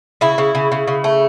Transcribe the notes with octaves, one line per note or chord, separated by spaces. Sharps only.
C#3 E4
C#3
C#3
C#3
C#3
A3